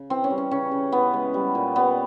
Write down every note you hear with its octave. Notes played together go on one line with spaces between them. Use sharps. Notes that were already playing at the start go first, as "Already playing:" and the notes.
Already playing: C#3
E3 C4
C#4
G3
C#4
C#3 C#4
C#3
E3 B3
G#3
G3
A#2
G3 B3